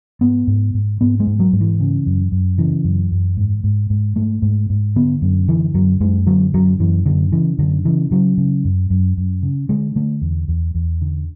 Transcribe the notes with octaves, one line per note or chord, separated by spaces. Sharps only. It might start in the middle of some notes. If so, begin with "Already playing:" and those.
G#2 B3
G#2
G#2
G#2 B3
G#3
G#2
F#3
G#2
E3
C#3
F#2
F#2
C#3 E3
F#2
F#2
G#2
G#2
G#2
G#2 A3
G#2
G#2
D3 B3
F#2
D3 E3
F#2 F#3
F#2 G#3
D3 F#3
F#2 F#3
F#2 E3
F#2 D3
C#3 E3
F#2 D3
C#3 E3
C#3 F#3
C#3
F#2
F#2
F#2
C#3
D3 G#3
D3 A3
E2
E2
E2
D3